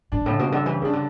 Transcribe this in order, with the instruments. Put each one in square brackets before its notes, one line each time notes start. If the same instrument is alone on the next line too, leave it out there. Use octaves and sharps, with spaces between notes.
[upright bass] A2 [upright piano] D4
[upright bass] G2
[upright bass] A2 [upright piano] C#3
[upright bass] B2
[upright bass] D3 [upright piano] G3
[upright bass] E3 [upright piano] G4
[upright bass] C#3 [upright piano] D4
[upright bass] D3